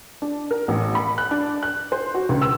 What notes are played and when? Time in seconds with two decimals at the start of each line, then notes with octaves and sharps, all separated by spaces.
0.22 D4
0.51 A#4
0.68 A1
0.95 B5
1.18 F#6
1.31 D4
1.63 F#6
1.92 C5
2.15 F#4
2.29 C#2
2.42 E6